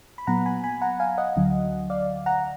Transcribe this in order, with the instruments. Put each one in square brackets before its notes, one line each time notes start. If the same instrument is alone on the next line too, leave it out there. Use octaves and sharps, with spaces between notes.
[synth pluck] B5
A#2 F#3 B3 F#5 A#5
G#5 B5
G#5 B5
F#5 A#5
F5 G#5
D#5 F#5
D2 D3 F#3
D5 F5
F#5 A#5